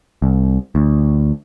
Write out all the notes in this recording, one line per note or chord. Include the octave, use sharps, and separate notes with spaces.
C2
D2